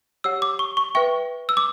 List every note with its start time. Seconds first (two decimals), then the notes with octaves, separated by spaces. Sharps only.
0.24 G4 C#5 F#5 E6
0.42 D6
0.59 C#6
0.77 C#6
0.95 B4 E5 G5 C#6
1.49 E6
1.57 D6